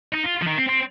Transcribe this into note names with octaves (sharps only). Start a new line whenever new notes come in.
D#4
F4
F3
D#3
C4
C4